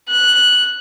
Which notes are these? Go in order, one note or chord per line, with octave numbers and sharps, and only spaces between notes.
F#6